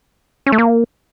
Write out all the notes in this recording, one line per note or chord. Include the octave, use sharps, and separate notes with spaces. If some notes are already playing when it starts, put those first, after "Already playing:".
C#4
A3
A#3